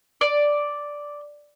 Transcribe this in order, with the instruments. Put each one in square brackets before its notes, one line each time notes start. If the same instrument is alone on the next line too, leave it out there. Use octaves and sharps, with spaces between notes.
[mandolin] D5